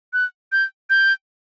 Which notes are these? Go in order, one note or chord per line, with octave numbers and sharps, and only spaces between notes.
F#6
G6
G6